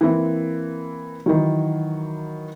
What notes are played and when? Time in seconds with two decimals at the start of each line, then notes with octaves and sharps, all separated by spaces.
0.01 E3 A#3 C4 E5
1.26 D#3 E3 F#3